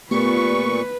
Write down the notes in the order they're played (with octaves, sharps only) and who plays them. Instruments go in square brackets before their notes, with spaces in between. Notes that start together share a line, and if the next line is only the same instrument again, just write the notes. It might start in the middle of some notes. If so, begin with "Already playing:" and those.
[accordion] A#2 C#6 [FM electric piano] A3 B3 G4 [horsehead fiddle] B4